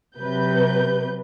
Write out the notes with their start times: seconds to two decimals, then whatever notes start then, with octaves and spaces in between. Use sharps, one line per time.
0.17 C3 F#3 B4 G6